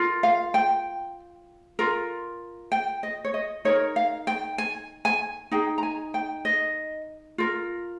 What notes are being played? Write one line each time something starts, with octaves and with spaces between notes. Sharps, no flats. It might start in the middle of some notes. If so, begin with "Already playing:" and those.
Already playing: F4 A#4
F5
G5
F4 A#4
G5
D#5
C#5
D#5
D#4 A#4 C#5
F5
G5
G#5
G#5
D#4 G#4 G5
A#5
G#5
G5
D#5
F4 A#4